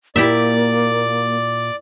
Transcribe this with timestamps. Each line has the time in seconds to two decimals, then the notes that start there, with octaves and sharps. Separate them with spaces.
0.16 A#2 A#3 E4 G4 D5 E5 D6